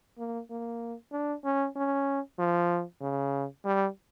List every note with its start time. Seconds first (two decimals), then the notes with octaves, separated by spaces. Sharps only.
0.18 A#3
0.50 A#3
1.12 D4
1.45 C#4
1.76 C#4
2.39 F3
3.02 C#3
3.65 G3